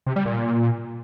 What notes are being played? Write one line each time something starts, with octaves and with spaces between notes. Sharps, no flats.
C3
G3
A#2